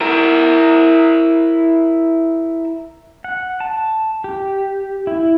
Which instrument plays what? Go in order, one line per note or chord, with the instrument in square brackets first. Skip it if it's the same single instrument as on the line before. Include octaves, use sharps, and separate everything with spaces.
[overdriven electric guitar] E4 A#4
[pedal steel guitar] F#5
A5
G4
E4